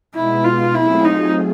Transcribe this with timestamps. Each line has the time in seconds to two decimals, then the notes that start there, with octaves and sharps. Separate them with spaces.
0.14 B2 G#3 B3 D#4 E4
0.44 F4
0.74 F#3 A3 C4 E4 F4 G#4
1.05 D#4